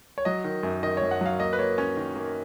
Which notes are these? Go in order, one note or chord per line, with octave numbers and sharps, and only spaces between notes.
C#5
F#3 D#5
D#3
F#2
D#3 D#5
C#5
F#2
F#5
F#3 F5
A#3 D#5
B4
A#3 C#5
C#4 C#5
D#3
A#3